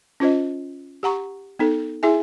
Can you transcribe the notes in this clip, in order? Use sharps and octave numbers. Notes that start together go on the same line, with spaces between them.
C#4 F4 C5 D#5
G4 F#5 A#5 C#6
B3 D#4 A4
E4 G#4 E5 G#5